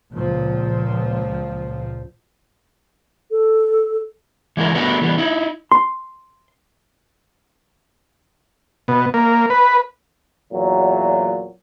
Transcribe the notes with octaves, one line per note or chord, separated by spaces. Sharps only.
C#2 A#2 F3
A4
E3 G#3 E4 A#4
A3 B3 D4 F#4 A#4 B4
E3 G3 B3
D#4 E4
C6
B2
A#3
B4
E2 A#2 F#3